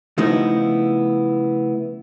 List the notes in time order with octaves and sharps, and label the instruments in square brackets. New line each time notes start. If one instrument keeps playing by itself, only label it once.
[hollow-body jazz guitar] C#3 F3 A3 B3 D#4 E4